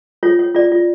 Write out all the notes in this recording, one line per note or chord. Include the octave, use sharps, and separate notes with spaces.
F4 C#5
C#5
F4 D5
F4